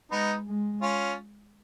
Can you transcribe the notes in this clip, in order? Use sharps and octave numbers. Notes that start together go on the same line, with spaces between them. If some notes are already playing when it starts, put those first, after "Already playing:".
G#3 B3 D#4
G#3
C#4 F4